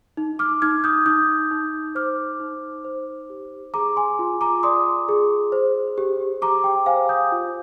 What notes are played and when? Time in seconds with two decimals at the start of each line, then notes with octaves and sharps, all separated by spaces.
0.17 D#4
0.39 D6 F6
0.62 D#4 F6 G#6
0.84 D#6 G6
1.06 D#4 D#6 G6
1.51 D#4
1.95 C5 D6 F6
2.40 D#4
2.84 C5
3.30 G4
3.74 G#4 A#5 D6
3.96 G#5 C6
4.19 F4
4.41 A#5 D6
4.63 D5 C6 D#6
5.09 G#4
5.52 C5
5.98 G4
6.42 G4 A#5 D6
6.64 G5
6.86 C5 F5 G#5
7.09 D#6 G6
7.32 F4